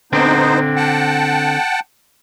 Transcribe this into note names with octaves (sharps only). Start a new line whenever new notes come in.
D3 B3 C4 D4 D#4 C5
F#5 G5 A5